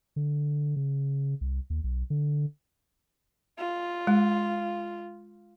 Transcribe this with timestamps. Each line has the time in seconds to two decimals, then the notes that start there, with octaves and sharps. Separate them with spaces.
0.16 D3
0.76 C#3
1.41 C2
1.70 D#2
1.84 B1
2.10 D3
3.59 F4
4.07 G#3